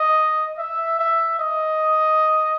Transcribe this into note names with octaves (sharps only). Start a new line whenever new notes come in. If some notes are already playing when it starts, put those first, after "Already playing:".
Already playing: D#5
E5
E5
D#5